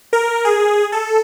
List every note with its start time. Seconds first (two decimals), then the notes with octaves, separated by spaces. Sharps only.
0.13 A#4
0.45 G#4
0.92 A4